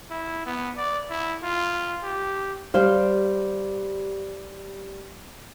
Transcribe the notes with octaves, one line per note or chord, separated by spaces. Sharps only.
E4
B3
D5
E4
F4
G4
G3 G4 C5 F5